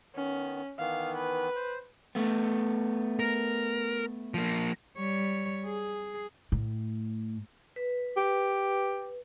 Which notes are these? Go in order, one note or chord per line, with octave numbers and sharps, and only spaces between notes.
D#3 B3 C#4
D#3 E3 B3 F5
B4
C5
A3 B3
A#4
F3 A#3
G3 C#5
G#4
A2
B4
G4